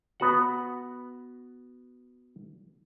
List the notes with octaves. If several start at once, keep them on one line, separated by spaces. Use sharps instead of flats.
B3 F#4 F#5